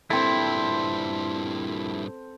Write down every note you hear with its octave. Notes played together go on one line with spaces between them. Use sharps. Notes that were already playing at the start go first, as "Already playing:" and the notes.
G2 A#2 C4 E4 A4